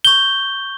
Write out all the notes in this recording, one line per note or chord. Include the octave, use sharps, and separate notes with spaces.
C#6 G6 G7